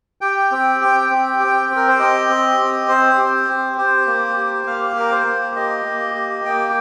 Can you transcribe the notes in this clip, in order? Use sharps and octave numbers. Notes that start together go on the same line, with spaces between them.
G4 G5
C4
G4
C4
G4
C4
A#4
C5
G4 D#5
C4
G4
C4 C5
G4
C4
G4 C5
A#3
G4
A#3 F5
G4 A#4
C5
A#3
G4 D#5
A#3
G4
A#3 G5